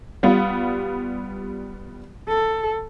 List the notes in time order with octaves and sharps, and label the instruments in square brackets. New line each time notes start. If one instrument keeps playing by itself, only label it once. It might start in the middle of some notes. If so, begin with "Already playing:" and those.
[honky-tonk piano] G3 B3 F4
[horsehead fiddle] A4